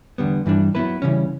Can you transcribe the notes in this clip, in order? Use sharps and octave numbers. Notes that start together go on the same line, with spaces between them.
E2 D3 G3 B3
G2 E3 G3 D4
F#3 B3 E4 B4
C#3 E3 G3 C#4